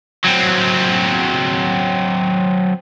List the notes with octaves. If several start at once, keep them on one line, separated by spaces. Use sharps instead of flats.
F#3 C4